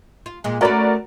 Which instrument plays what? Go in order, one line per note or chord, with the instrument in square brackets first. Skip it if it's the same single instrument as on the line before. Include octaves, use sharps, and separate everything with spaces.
[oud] F4
A#2 G#3
[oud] A3 C#4 B4 [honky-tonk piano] F#4 A#4 D5